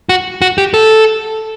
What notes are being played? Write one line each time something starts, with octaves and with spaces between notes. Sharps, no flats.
F#4
F#4
G4
A4